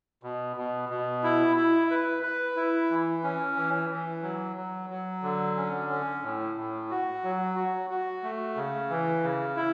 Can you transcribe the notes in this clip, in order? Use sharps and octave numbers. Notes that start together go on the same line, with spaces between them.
B2
B2
B2
E4
E4
B4
B4
E4
E3
C#4
E3
E3
F#3
F#3
F#3
D3
C#4
C#4
A2
A2
F#4
F#3
F#4
F#4
A3
C#3
E3
C#3
E4